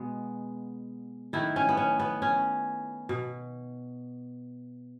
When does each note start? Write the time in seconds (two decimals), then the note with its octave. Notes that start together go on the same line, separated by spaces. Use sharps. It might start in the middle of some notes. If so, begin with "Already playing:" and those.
Already playing: B2 G#3 B3
1.33 D#3 A3 E4
1.56 C#4
1.69 B3
1.77 C#4
2.00 B3
2.22 C#4
3.09 B2